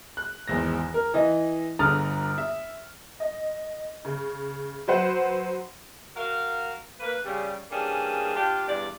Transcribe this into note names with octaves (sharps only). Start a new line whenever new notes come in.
F#6
G#1 E2 A#6
A#4
E3 D#5
G1 D3 A#5 D#6 F6 A6
E5
D#5
C#3
F#3 B4 C5 F#5
F#4 A#4 F5
A#3 B4
C#3 G3
E3 G3 A#3 C#4 D4 G#4
D4 F4 G4
E2 G2 D5